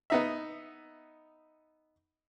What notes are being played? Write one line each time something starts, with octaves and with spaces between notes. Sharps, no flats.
B3 D#4 E5